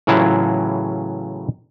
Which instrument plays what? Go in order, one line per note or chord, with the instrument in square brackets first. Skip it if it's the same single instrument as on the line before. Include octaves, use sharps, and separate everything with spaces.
[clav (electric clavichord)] A2 C#3 E3 F#3 E4 F4